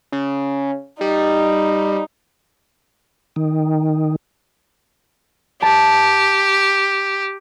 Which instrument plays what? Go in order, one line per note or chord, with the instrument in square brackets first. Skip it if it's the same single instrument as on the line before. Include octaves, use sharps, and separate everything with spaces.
[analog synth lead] C#3
[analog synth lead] G3 [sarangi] D#4
[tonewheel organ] D#3
[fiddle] G4 [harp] A5